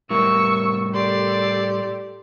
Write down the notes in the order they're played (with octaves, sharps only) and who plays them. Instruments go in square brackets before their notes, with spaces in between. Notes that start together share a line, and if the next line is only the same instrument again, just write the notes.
[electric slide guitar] A2 G3 A#4 [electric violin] C#6 E6
[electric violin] G4 A4 [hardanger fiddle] D5 C6